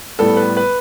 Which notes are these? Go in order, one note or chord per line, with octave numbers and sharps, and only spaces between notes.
A2 G3 B3 A4
B4
B4